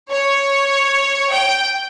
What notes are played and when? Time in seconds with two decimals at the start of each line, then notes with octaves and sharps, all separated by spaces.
0.10 C#5
1.32 G5